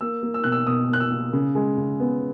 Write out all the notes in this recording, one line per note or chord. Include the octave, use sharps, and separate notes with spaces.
A#3 E6
A#3
E6
B2 F#6
E6
B2 D#6
A#3 F#6
E6
A#3
C#3
G#3
C#3
B3